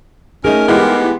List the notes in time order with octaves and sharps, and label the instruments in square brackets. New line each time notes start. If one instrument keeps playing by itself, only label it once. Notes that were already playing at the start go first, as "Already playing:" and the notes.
[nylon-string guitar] A3 D#4 G#4 [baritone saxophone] C#4 [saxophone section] A#4
[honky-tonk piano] E3 G#3 G4 [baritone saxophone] B3